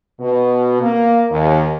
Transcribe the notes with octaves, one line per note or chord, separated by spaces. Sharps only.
B2
A#3
D#2